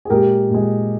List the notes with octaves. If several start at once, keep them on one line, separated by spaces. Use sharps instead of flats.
G#4
A#2 G#3 G4 A#4
A#2 G#3